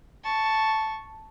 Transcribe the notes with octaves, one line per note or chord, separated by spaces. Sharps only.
A5 C#6